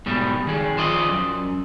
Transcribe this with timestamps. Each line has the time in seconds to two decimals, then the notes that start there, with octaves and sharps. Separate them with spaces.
0.06 G#2 B2 G3
0.47 D#3 G#4
0.77 F3 C5 D5 D#5
1.08 F#2